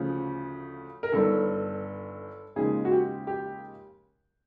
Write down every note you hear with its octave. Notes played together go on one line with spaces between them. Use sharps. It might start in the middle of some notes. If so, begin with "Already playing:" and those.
Already playing: D2 C#3 F3
A#4
G1 G2 D#3 A4
D#2 C#3 F3 G#3 G#4
F#4
G4
G4